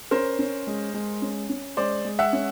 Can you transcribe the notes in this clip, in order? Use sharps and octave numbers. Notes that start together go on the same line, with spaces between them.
C#4 A#4 C5
C#4
G#3
G#3
C#4
C#4
G#3 C5 D5
G#3
E5 F#5
C#4